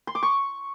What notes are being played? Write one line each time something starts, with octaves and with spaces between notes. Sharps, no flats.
C6
D6
C#6